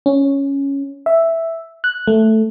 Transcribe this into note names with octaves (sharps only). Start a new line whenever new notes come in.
C#4
E5
F#6
A3